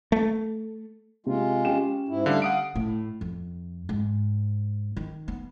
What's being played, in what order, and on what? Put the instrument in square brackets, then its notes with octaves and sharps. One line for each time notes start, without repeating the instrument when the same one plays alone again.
[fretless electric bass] A3
[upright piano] C3 [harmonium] G#3 F4
[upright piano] C#4 G4 E7
[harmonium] G#2 E4
[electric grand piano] D3 G3 [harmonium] A3 F5
[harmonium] F5 [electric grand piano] F#5 D#6 D7
[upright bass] A2
F2
G#2
D#3
B3